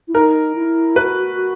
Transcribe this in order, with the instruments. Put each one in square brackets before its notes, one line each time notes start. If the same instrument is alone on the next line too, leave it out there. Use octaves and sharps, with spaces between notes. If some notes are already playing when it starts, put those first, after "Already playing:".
[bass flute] E4
[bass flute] D#4 [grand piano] A#4
[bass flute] E4
[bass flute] F#4 [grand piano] B4